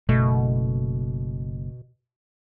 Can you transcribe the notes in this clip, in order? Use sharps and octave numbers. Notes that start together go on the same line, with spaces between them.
F#1 B2 A3